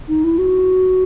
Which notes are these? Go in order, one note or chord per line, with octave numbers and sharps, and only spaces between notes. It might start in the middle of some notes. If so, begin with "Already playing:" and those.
D#4
E4
F#4